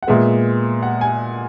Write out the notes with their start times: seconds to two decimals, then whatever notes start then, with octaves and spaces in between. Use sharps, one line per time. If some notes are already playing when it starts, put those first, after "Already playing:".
0.03 F#5
0.07 A#2 G#3 B3 E5
0.83 F#5
1.01 G#5